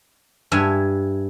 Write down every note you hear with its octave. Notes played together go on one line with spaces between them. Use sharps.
G2 E5 G#5